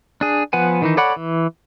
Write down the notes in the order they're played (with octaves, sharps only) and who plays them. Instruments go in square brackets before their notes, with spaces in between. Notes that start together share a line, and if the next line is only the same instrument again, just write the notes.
[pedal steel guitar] D4 G#4
F3 B3 B4 F#5 G#5
D#3 E3 D#4
A4 C#5 D5 F#5 B5
E3